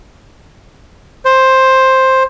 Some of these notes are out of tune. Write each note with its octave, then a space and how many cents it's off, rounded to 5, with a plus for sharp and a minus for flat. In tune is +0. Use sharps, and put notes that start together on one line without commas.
C5 +10